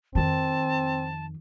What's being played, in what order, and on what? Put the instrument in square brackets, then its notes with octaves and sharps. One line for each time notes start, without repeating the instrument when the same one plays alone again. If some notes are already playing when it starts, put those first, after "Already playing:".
[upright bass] F2 D#3 [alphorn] C4 [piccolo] A5